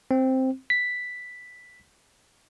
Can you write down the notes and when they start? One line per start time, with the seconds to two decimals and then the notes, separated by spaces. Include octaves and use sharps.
0.11 C4
0.70 B6